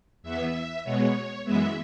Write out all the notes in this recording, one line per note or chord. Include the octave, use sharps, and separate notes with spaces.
E2 E3 B3 E5
B2 G#3 B3 C#5
F#2 E3 G#3 B3 E5